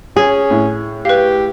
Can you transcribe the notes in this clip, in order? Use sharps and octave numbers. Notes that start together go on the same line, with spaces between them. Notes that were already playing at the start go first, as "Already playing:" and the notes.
C#4 G#4
A2
G4 B4 F5